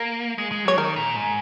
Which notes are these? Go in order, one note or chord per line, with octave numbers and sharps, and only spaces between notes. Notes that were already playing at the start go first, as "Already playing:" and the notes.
Already playing: A#3 A#4
G#3
G#3
F#3 C#5
D#3 A#4
A#2
G#2